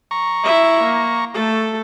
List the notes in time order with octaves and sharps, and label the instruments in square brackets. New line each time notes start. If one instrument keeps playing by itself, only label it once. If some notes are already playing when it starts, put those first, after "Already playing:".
[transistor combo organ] A#5 C#6
[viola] E4 E5
A#3
A3 A4